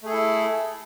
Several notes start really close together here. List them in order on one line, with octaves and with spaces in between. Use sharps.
A3 G#4 A4 E4